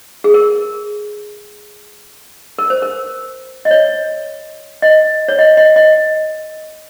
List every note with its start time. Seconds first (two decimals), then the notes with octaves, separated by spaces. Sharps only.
0.24 G#4
0.34 A#4
2.58 A#4
2.70 C5
2.82 A#4
3.65 D#5
3.71 C#5
4.82 D#5
5.28 C#5
5.39 D#5
5.57 D#5
5.76 D#5